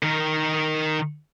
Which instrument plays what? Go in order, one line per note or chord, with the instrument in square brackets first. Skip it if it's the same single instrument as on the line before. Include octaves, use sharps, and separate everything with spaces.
[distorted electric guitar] D#3 A#4